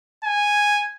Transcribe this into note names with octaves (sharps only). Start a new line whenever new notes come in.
G#5